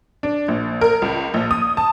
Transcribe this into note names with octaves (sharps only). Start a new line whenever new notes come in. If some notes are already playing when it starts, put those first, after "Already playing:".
D4
A#1
A#4
C#2
A#1
D#6
A5